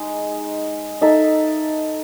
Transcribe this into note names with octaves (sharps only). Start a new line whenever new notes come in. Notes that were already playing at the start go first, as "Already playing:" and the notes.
Already playing: G#3 D#4 G#4
D#4 A4 E5